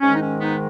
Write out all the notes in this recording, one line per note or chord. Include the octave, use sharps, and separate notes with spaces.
G#2 D#3 G#3 C#4
D#4
C#4
B3 D#4